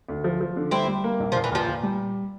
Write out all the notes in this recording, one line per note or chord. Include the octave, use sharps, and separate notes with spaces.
D2
F3
F3
D3
G3 C4 E4
G3
A#3
A#1
F3
A#2
E3
A#2 F3
A#2
G3